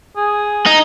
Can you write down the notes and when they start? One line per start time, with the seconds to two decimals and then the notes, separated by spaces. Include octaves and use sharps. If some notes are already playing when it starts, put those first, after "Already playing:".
0.17 G#4
0.66 D#4